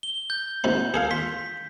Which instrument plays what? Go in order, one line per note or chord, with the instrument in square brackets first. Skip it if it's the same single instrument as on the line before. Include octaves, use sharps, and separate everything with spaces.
[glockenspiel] G7
G6
[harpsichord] G#2 C3 B5
G#4 A4 F5
[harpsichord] C6 [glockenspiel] B6